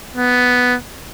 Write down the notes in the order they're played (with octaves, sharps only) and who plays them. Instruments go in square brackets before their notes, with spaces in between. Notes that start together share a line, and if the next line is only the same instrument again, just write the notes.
[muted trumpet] B3